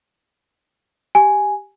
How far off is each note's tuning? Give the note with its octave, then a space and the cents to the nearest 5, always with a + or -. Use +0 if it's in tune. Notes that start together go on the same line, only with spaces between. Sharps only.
G4 +0 G#5 +0